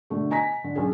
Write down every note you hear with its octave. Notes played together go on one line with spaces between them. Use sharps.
B2 D3 A3
D#5 G#5 A#5 A#6 B6
D3
B1 C#4 G#4